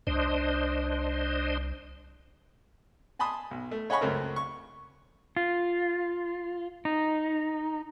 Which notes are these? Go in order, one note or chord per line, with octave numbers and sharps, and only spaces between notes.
C2 D4 C5 D#5
G#5 A5 B5 C6 D#6
B1
A3
C#5 D#5 F#5 G#5 B5 C#6
C#2 F#2 A3 C4 A#4
C#6
F4
D#4